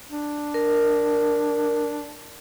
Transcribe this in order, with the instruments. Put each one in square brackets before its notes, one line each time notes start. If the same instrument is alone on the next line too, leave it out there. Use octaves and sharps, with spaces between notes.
[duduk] D4
[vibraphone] A#4